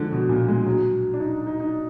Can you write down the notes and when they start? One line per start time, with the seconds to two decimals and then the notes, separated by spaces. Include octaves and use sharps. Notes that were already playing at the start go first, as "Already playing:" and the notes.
Already playing: D3 F3 G#3
0.12 B2
0.29 A#2
0.48 G#3
0.66 F#3
1.14 D4
1.20 D#4
1.47 D#4
1.60 D#4